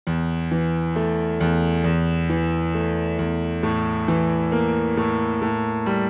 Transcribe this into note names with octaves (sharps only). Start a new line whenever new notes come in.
E2
E3
A3
E2
E2
E3
A3
E2
A2
E3
A#3
A2
A2
G3